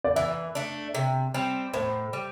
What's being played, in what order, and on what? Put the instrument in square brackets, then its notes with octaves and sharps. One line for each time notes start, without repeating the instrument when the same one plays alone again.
[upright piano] D5
[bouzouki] E3 [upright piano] E5
[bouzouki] A3 D4
C3
G3 C4
[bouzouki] A2 [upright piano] C5
[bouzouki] G3